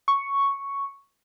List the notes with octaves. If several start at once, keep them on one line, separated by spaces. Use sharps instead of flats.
C#6